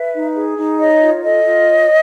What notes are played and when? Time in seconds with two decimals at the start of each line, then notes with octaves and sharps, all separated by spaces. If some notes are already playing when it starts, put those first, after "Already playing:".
Already playing: B4 E5
0.13 D#4
0.35 G#4
0.58 D#4
0.79 C#5 D#5
1.01 F4
1.23 A4 D#5
1.45 F4
1.67 C#5